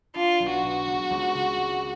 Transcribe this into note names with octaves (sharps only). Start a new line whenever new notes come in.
D4 F4
B1
F#4
B2
C#2
C#2
C#3
G#3